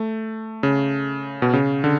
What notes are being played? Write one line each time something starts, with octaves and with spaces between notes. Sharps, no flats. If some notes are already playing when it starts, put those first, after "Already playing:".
Already playing: A3
C#3
B2
C#3
D3